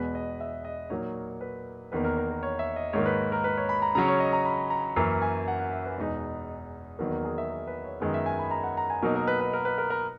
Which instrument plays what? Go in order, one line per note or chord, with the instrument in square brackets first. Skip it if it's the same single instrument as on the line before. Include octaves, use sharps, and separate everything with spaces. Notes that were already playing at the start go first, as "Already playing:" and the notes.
Already playing: [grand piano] E2 B2 G#3 B4
D#5
E5
D#5
A#2 F#3 A#3 D#4 C#5
B4
E2 D#3 A#3 B4
A#4
A#4
A#4
C#5
E5
D#5
G#2 D#3 A#3 C#5
B4
A#4
B4
C#5
B5
A#5
C#3 F#3 C#4 A#5
C#5
D#5
A#5
B5
A#5
F#2 E3 A#3 C#4 A#5
G#5
F#5
F#5
E5
B4
E2 B2 G#3 D#4
E2 D#3 F#3 A#3 B4
A#4
G#4
E5
A#4
B4
C#5
F#2 D#3 G#3 B3 D#5
E5
G#5
B5
A#5
F#5
A#5
G#5
B2 F#3 A#3 D#4 A#4
A#4
B4
B4
A#4
B4
A#4
A#4